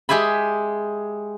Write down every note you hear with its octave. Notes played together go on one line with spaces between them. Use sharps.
G#3 G4 G#4 E5 B5